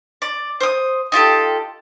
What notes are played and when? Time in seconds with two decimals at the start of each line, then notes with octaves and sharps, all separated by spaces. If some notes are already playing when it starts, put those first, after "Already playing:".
0.22 D5
0.60 C5 D#6
1.12 D#4 F4 G4 A4